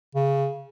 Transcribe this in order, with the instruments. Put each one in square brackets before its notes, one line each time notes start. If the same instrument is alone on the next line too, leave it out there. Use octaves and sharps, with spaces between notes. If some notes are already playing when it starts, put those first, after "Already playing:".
[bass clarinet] C#3